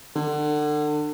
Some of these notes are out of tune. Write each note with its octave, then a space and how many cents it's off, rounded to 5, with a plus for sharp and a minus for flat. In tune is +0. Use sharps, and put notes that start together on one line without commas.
D3 +30